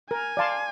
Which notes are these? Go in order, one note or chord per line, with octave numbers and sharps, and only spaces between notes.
A#4 G#5
D5 F5 A5 C6